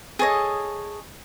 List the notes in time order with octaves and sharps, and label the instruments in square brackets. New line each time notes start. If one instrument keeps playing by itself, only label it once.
[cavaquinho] G#4 A4 C#5 D#5